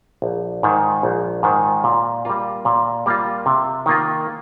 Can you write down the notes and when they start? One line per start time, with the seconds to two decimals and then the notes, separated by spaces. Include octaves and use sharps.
0.22 A#1
0.63 G#2 D#3
1.03 A#1
1.43 G#2 D#3
1.84 A#2
2.25 G3 A#3 F4
2.65 A#2
3.06 G3 A#3 F4
3.46 C3
3.86 D#3 A#3 F4